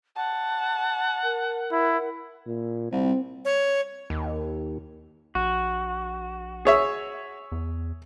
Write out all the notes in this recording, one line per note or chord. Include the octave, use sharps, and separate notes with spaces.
F#5 A5
A#4
E4
A#2
C2 C4
C#5
D#2
A#1 F#4
G#4 C#5 E5
E2